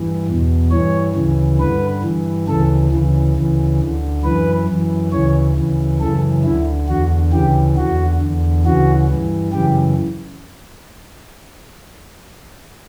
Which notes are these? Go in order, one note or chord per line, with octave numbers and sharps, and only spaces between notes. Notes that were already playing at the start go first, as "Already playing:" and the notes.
Already playing: G2 E3
E2 B2
G2 E3 C#5
D2 C#3 E3
G2 D3 B4
G2 E3
D2 C#3 E3 A4
D2 C#3 E3
D2 C#3 E3
D2 D3
F#2 E3 B4
F#2 E3
D2 C#3 E3 C#5
D2 C#3 E3
F#2 C#3 E3 A4
D2 D3 E4
E2 D3 F#4
D2 C#3 E3 G4
E2 D3 F#4
E2 D3
D2 C#3 E3 F#4
G2 E3
F#2 C#3 E3 G4